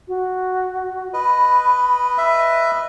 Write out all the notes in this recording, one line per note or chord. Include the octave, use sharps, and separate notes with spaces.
F#4
B4 D#5 B5
E5